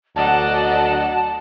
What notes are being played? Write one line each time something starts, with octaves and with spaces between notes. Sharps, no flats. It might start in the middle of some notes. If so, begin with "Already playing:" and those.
D2 F#3 D5 D#5 F#5 A5